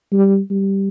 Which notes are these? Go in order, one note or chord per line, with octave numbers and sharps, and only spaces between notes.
G3
G3